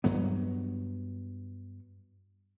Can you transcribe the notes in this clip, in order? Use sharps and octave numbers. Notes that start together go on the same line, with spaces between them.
G2 F#3 B3